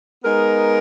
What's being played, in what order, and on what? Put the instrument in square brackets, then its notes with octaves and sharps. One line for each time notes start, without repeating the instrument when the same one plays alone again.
[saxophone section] G#3 B3 D#4 A#4